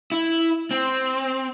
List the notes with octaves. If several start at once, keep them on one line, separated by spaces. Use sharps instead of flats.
E4
C4